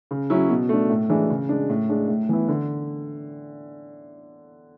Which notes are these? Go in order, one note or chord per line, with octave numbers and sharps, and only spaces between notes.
C#3
F#3 C#4 E4
B2
A3 D4
A2
E3 G#3 D4
C#3
G#3 D4
A2
G#3 D4
A2
E3 B3 E4
D3